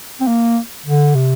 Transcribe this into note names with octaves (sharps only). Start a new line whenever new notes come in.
C4
A#3
D3
C3